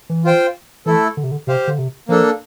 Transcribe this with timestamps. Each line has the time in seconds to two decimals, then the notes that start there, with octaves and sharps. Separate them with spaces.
0.10 E3
0.24 F4 C5 G5
0.86 E3 A3 E4 A4
1.17 D3
1.24 C3
1.31 D3
1.47 C3 G4 C5 F5
1.67 D3
1.78 C3
2.08 F3 A#3 D4 A4